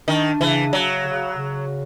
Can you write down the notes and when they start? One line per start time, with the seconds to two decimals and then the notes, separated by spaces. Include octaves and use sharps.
0.08 D#3 D4
0.40 C#3 E3
0.73 C#3 F#3
1.06 C#3
1.38 C#3